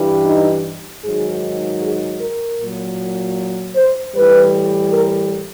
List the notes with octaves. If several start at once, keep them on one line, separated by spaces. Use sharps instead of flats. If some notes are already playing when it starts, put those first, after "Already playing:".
Already playing: G2 E3 G3
D#4
G#2 D#3 F#3 G#4
G#4
A#4
A#2 F#3
C5
A2 E3 G3 B4
A#4